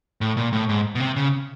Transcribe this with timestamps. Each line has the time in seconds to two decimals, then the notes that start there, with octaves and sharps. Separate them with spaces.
0.21 A2
0.37 A#2
0.53 A2
0.69 G#2
0.95 B2
1.00 C3
1.16 C#3